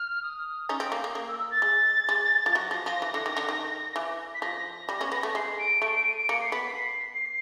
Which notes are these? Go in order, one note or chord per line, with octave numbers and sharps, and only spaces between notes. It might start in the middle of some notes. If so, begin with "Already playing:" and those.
Already playing: F6
D#6
C#4 D#4
C4
A#3
A#3
A#3
E6
E6
A6
G#3
G#3
F3
F#3 A#6
F3
F3
E3
D3
D#3
D3
D#3
E3
B6
F3 A#6
G3
B3 C#4
B3
A3
G#3 C7
D7
A3 D7
D7
D#7
D7
A#3 C#7
C7
B3 B6
B6
C7